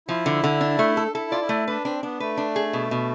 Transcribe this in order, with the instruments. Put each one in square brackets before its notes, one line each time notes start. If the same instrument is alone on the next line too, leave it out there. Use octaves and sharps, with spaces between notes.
[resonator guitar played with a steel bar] F3 [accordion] E4
[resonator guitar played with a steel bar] D3
D3
D4
A3
A4
[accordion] E4 [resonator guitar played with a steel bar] A4
[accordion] F4 [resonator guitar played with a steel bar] D5
[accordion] E4
[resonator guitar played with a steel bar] A3
[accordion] D4 [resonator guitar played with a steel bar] B4
[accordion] C4 [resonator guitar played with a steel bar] D4
[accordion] B3 [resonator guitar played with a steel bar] D4
[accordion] A3 [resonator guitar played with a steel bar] B4
[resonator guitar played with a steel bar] D4
G#4
B2
B2